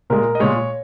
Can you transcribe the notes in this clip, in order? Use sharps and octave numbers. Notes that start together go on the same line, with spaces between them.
A#2 G#3 A#4
D#5
A#2 G#3 C#5